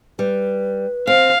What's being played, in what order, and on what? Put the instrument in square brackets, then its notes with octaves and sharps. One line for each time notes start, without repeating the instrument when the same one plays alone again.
[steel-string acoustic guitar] G3 [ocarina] B4
[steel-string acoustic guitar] C4 [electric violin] F5